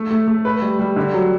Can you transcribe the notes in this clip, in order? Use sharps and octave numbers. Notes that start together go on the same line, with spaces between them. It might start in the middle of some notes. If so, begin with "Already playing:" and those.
Already playing: A3
A3
A3
B4
G3
G3
D3
F#3